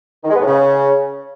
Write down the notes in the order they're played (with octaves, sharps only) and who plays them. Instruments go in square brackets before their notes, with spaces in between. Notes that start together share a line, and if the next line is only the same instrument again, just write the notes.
[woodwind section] D#3
G#3
B3
A2
C#3